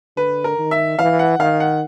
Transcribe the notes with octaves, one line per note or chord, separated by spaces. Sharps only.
D3 B4
A#4
D#3
E5
E3 F5
F#5
D#3 F5
F#5